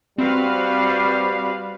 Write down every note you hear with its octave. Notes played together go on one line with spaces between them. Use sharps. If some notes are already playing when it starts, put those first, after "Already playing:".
G3 C4 F#4 B4 F5